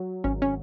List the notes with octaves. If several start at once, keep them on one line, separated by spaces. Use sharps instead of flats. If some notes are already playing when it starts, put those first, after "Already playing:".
Already playing: F#3
G#1 C#4
C#4